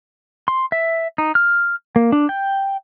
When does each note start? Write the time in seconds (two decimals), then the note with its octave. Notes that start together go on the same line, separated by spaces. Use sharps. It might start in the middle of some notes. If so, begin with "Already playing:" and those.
0.48 C6
0.72 E5
1.18 D#4
1.35 F6
1.96 A#3
2.12 D4
2.29 G5